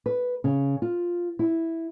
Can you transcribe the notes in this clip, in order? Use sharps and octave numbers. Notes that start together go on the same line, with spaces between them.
B4
C#3
F4
E4